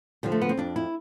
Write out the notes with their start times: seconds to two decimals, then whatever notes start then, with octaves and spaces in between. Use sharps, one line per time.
0.23 D3 F3 G3
0.32 A3
0.41 B3
0.49 C4
0.57 F2 D4
0.76 E4